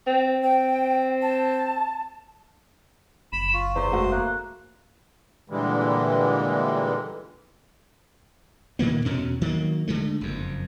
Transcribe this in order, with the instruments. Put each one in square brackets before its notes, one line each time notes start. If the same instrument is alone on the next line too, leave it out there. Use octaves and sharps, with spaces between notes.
[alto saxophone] C4
[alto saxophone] C4 [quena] G5
[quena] A5
[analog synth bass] F#1 [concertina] B5 [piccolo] E7
[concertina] F4 [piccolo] C#6
[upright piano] E2 [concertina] C5
[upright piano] G#3 A3 F#4
[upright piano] A#3 [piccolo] F#6
[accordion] A#2 D3 E3 G3 G#3
[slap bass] A#2 D#3 A#3 B3
E2 B2 C#4
D#3 F#3 G#3 A#3
D3 G#3 A3
F#1 F2